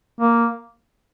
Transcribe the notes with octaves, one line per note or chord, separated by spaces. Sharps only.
A#3